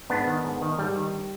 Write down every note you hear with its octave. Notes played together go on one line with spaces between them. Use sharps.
G#2 B3 D4
D#3
G#2
D#3
G#2 G3
D#3